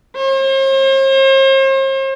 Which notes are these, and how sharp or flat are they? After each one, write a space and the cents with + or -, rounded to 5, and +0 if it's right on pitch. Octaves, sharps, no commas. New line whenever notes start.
C5 +45